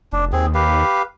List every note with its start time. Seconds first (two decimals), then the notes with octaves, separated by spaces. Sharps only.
0.13 F1 D4
0.33 D#2 C4 G#4
0.54 G4 B4 F5